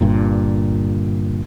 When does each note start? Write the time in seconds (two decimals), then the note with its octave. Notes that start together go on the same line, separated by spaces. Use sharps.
0.01 G1 G2 A#2